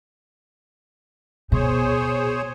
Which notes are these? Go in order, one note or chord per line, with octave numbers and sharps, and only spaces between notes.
B2 G#4 C5 C#5